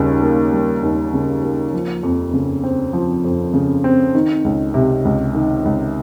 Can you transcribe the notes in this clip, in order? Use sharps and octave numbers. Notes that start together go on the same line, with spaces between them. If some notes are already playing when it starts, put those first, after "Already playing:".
Already playing: D#2 C#3 G3
A#3
G3
D#2
C#3
A#3
F3
F2
C#3
C4
F3
F2
C#3
C4
D#3
C#2
C3
C#2
D#3
C#2